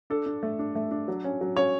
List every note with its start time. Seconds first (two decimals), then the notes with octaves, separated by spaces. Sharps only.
0.10 D4 A4
0.26 D4
0.43 A3
0.59 D4
0.75 A3
0.91 D4
1.08 F#3
1.24 C#4
1.41 F#3
1.57 C#4 C#5